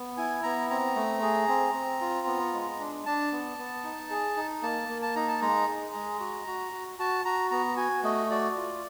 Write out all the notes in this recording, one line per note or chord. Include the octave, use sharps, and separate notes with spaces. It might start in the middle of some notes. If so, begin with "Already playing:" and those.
Already playing: B3
E4 G#5
B3 A#5
C4 A#5
A3
G#4
C4
C4
F4
B3
G#3
D4
D4 A5
B3
B3
D#4
G#4
D#4
A#3 A5
A#3
A5
D#4 A#5
A5
G#3 A#5
G#4
G#3
F#4
F#4
F#4
F#4 A5
F#4 A#5
B3 A#5
F#4 G#5
A3 D#5
F#4 D5
F4